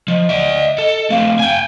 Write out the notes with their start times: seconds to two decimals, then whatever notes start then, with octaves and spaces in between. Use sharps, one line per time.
0.08 F3 D#5
0.29 D5 E5
0.78 A4
1.10 A3 C4 F5
1.39 G5 G#5